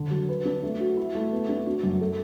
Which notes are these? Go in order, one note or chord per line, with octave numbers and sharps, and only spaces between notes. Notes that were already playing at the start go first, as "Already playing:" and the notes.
Already playing: D3
F#3
B4
D4
A3
F#4
E4
A3
B3
D4
F#4
F#2
A4